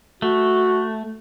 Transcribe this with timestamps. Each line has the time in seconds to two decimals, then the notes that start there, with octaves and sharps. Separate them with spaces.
0.22 A3 F#4